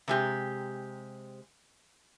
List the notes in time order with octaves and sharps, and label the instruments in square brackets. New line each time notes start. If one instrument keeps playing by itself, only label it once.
[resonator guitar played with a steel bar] C3 G#3 G4